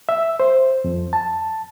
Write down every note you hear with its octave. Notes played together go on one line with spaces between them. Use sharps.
E5
C5
F2
A5